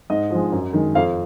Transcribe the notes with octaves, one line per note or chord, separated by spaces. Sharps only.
G#2 D#5
F3 G#3
F#2
D#3 G#3
F2 F5